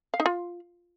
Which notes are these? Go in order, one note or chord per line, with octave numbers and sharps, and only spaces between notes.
F5
D#4
F4